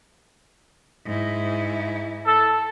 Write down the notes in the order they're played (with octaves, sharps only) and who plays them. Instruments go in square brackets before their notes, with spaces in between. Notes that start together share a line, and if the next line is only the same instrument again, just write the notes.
[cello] G#2 E4
[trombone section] A4